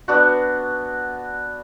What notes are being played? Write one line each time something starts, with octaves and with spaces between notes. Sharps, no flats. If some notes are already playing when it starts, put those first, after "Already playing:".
B3 D4 F#4